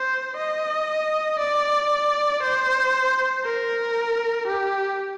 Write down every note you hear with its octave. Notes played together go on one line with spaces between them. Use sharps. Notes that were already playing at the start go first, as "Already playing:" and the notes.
Already playing: C5
D#5
D5
C5
A#4
G4